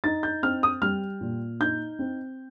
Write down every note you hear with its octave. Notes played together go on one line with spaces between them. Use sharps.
D#4 A6
G6
C4 F6
D#6
G3 F6
A#2
D#4 G6
C4